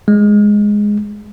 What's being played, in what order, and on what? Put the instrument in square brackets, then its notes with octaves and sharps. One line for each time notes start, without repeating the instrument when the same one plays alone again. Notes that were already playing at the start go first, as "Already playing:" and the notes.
[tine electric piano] G#3